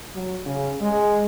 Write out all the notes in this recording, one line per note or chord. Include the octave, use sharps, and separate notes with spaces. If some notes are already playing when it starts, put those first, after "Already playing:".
F#3
C#3
G#3